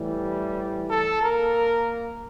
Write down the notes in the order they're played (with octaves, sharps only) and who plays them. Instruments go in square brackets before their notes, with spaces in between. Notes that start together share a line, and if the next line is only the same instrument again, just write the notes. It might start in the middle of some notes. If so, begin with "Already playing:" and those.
Already playing: [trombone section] A2 E3 G3
A4
A#3 A#4